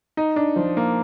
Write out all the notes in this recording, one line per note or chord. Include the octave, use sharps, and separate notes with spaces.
D#4
D4
F3
A#3